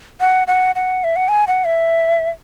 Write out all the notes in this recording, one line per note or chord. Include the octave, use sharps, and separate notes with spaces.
F#5
F#5
F#5
E5
F#5
G#5
F#5
E5